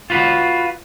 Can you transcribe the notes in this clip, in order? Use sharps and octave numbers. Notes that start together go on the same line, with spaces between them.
F4 F#4 B4